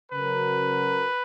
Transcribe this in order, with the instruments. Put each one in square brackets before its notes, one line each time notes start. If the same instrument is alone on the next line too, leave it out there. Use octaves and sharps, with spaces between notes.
[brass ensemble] C#3 F#3 C#4 F#4 A#4 [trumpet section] B4